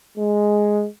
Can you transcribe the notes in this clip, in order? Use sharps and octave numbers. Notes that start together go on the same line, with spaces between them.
G#3